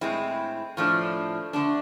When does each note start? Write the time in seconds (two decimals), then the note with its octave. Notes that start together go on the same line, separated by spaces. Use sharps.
0.01 A2 G#3 C4 E4
0.77 A2 F3 A3 D4
1.53 D3 A3 D4